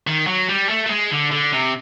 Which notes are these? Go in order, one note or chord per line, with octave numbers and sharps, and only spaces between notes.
D#3
F#3
G3
A3
A3
G#3
D3
D3
C3